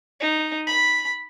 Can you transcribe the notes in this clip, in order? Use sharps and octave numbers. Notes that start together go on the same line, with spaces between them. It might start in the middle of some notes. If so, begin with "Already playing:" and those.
D#4
B5